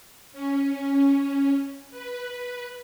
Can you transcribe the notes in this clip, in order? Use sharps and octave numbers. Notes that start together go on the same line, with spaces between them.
C#4
B4